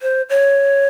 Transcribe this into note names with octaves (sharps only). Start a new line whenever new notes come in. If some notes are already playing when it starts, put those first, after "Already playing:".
C5
C#5